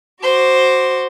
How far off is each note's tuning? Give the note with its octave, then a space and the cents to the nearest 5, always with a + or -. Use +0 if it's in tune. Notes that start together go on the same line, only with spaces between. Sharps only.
F#4 +5 C5 +0 D6 +0